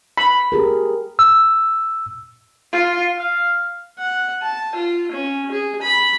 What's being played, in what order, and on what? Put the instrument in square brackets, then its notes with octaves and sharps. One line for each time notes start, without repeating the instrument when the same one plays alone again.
[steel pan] B5
[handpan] G4 G#4 A#4
[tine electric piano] E6
[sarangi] F4
[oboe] F5
[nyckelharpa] F#5
A5
F4
C#4
G#4
B5